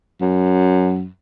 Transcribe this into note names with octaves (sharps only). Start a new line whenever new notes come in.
F#2